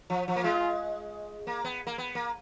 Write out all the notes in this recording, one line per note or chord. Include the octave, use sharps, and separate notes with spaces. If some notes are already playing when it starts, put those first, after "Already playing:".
F3
F3
A#3
G#3 F4
A#3
B3
A#3
B3
A#3